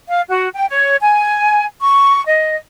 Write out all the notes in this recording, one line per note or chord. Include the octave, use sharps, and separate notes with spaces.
F5
F#4
G5
C#5
G#5
C#6
D#5